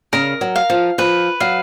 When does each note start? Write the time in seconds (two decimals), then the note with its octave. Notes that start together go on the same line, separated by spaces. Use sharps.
0.13 C#3 A#4
0.41 F#3
0.56 F5
0.70 F3
0.98 F3 B4
1.40 F#3 F5